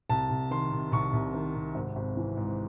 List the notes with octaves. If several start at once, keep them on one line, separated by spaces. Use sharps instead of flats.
C2 A5
C2
D#3 C6
C3
C2 C#6
C2
D#3
C3
G#1
G#1
E3
G#2